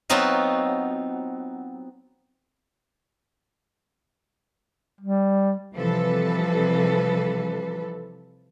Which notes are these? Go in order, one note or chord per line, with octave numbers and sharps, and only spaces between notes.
F#3 B3 C4 D#4 F4
G3
C3 E3 F3 G3 A4 B4